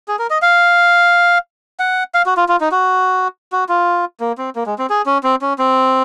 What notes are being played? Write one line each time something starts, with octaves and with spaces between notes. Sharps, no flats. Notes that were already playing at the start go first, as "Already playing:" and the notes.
G#4
A#4
D#5
F5
F#5
F5
F#4
F4
F4
D#4
F#4
F#4
F4
A#3
C4
A#3
G#3
C4
G#4
C#4
C4
C#4
C4